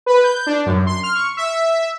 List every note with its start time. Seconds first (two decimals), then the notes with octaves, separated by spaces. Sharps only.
0.06 B4
0.24 G6
0.47 D4
0.66 F#2
0.87 C6
1.03 F6
1.15 C#6
1.37 E5